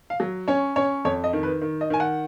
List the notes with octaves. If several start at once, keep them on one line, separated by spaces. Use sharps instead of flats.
F5
F#3
C#4 C#5
C#4 C#5
F2 C#5
D#5
D#3
B4
D#3
D#5
D#3 G#5
F#5